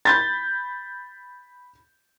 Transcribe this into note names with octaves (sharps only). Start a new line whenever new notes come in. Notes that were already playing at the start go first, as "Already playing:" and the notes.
B5 G6 A6